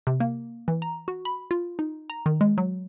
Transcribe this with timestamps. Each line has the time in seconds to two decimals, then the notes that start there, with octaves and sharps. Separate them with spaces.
0.07 C3
0.20 A#3
0.68 E3
0.82 A#5
1.08 F#4
1.25 B5
1.51 F4
1.79 D#4
2.10 A#5
2.26 D#3
2.41 G#3
2.58 F#3